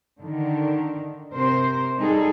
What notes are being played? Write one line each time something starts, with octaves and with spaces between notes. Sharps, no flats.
D3 D#3
C3 A#4 C5
G3 D#4 G#4 A4